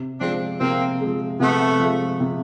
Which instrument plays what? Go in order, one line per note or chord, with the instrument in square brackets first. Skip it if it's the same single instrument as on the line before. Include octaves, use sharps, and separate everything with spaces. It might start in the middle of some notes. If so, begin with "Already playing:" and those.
Already playing: [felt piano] C3
[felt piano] F3 G#3 [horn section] C4 D4
[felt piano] C3 [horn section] A#3 C4
[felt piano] F3 G#3
[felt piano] C3 [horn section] A3 B3
[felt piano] F3 G#3
C3